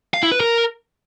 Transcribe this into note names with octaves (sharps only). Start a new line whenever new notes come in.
F5
E4
B4
A#4